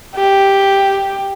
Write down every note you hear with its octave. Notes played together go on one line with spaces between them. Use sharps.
G4